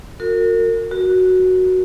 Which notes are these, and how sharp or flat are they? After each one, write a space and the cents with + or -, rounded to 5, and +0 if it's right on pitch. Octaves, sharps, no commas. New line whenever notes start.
F#4 -30 A#4 -35
F#4 +0 A#4 +25